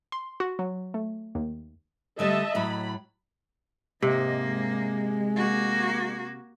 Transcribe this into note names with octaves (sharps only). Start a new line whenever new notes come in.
C6
F#4
F#3
A3
D#2
D3 G3 A3 D#5 E5 A5
A2 F#3 B5
G#2 C3 A#3 D#5
G#3
A#3 F#4